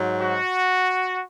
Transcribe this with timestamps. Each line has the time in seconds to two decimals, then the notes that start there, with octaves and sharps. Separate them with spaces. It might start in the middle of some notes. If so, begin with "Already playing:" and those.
Already playing: G#2 F#3
0.22 F#4